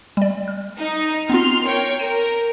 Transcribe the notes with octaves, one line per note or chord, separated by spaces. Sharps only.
G3 D5
F6
D#4
B3 C4 F4 C6 F6
A#4 C#5 G5
A#4 D#7